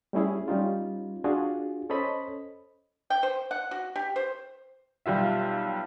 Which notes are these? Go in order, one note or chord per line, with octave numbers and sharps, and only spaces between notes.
G3 A3 C#4 E4 G#4
G3 C#4 D#4 F4
D4 F4 F#4 G#4
C#4 A4 C5 C#5 D#5 B5
G5
C5
F#5
F#4
G4
C5
B1 G3 F4 E5